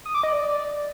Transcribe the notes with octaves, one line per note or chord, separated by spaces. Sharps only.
D#6
D6
D#5
D5